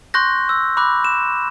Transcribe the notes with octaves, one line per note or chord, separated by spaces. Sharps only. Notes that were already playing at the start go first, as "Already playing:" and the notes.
C6 C#6 F#6 G6 A#6
E6
B5 D6 F#6
E7